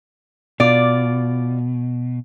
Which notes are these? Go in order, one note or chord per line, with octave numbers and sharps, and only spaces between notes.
B2 F4 D5